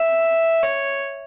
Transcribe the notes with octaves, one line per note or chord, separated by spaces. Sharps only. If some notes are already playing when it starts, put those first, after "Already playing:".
Already playing: E5
C#5